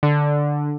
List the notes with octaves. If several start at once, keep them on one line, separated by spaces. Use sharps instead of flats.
D3